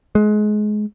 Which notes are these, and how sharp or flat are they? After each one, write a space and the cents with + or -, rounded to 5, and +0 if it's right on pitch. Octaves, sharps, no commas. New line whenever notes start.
G#3 +25